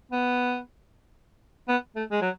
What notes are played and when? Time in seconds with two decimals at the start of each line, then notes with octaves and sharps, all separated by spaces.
0.11 B3
1.69 B3
1.96 A3
2.11 G#3
2.22 F#3